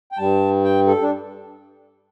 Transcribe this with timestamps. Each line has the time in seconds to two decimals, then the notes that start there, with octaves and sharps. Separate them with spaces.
0.12 G5
0.18 G2 G3 A5
0.64 G5
0.87 A4
1.02 D4